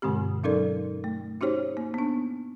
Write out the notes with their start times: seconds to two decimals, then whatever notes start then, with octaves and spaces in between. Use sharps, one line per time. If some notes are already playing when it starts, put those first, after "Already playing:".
0.02 G2 B2 D3 G#3 C4 G4
0.44 F#3 C#4 D#4 A4 A#4 D5
1.04 A3
1.41 C#4 D#4 F#4 G4 C5 C#5
1.77 A#3
1.94 B3 D4